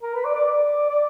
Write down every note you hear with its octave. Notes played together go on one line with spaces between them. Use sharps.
A#4
B4
D5
D5
D5
D5